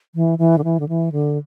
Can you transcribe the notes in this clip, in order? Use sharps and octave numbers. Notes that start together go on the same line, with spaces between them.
E3
E3
D3
E3
D3
E3
D3